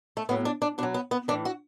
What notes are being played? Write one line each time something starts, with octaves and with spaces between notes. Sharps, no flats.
A3
A2 F#3 B3
D4
D4
B2 F#3 D4
B3
B3
A2 E3 D4
F#4